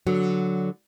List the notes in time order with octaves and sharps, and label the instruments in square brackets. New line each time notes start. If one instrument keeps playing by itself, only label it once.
[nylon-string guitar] D3 F#3